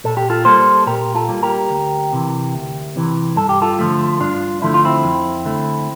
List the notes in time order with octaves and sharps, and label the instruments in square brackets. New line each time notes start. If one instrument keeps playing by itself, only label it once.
[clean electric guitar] A#2 A4
G4
F4 A4
G3 A#3 A4 C5
A#2 G4 A#4
F4 A4
G3 A#3
G4 A#4
D2
C3 E3
D2
C3 E3
G2 A4
G4
F4 A4
D3 F3 A3
G2 D4 F4
D3 F3 A3 E4
F4
C4 E4
F2
D3 A3